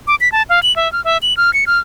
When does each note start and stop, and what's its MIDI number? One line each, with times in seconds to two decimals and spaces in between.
0.07 0.15 86
0.21 0.31 95
0.32 0.43 81
0.49 0.62 77
0.63 0.75 102
0.76 0.91 76
0.93 1.03 89
1.04 1.18 76
1.22 1.36 102
1.37 1.53 89
1.54 1.65 97
1.67 1.79 89